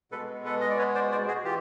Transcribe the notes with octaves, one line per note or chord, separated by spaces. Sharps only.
B2 G#3 B3 A4 B4
A4 B4
D#5
D5
B4 C#5
C5 D5
C5 D5
F#4 G#4
E3 F4 G4